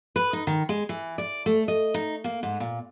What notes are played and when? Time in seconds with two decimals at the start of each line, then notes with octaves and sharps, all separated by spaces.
0.16 B4
0.33 D#4
0.47 D#3
0.69 G#3
0.89 E3
1.18 D5
1.46 A3
1.68 D#5
1.94 D#4
2.24 A#3
2.43 G#2
2.60 A#2